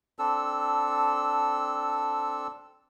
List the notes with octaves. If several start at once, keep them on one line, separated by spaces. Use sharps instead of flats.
C4 D4 A4 E6